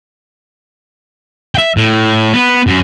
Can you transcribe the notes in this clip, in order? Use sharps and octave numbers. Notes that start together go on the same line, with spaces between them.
E5 G5
A2
B3
F#2